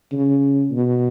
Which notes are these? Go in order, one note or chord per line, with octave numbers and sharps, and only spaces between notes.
C#3
B2